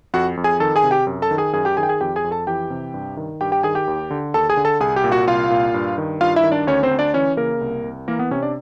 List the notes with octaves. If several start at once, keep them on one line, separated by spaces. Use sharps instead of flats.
F2 F#4 F#5
F2
G#4 G#5
D#3 A4 A5
G#4 G#5
C3
G4 G5
F#2
A4 A5
D#3
G#4 G#5
F#2 G#4 G#5
G4 G5
D#3 G#4 G#5
G5
G#4 G#5
F2 G4 G5
G#4 G#5
F2
A4 A5
E3 G4 G5
C3
G2
D#3
G2 G4 G5
G4 G5
D#3 G#4 G#5
G4 G5
D#2
D3
D#2 A4 A5
G#4 G#5
D3
A4 A5
C2 G#4 G#5
G4 G5
A#2
F#4 F#5
C2 F4 F5
A#2
G2
D#3
G2 F4 F5
E4 E5
D#3
D4 D5
D2 C#4 C#5
C4 C5
D2
D4 D5
E3 C#4 C#5
C#3 A#3 A#4
C2
C2
E3 A#3 A#4
B3 B4
C3 C#4 C#5
D4 D5